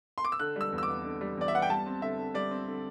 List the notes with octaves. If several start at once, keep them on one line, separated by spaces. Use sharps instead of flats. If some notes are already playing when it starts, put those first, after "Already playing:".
C6
D6
E6
D3 F#6
G3 E6
E2
E6
D6
B3
D3
G3
E2 D5
E5
B3 F#5
G5
G3 A5
C4
D3 E5
D3
G3 D5
C4
D3